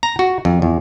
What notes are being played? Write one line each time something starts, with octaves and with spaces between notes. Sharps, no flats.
A#5
F#4
F2
E2